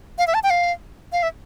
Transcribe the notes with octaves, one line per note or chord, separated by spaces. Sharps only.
F5
E5
A5
G5
F5
F5
E5